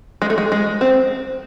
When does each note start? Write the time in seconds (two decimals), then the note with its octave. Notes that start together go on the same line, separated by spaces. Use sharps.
0.22 G#3
0.30 A3
0.38 G#3
0.52 G#3
0.81 C4